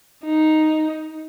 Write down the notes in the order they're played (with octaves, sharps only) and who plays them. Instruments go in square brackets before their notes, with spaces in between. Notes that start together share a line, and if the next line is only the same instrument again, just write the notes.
[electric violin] D#4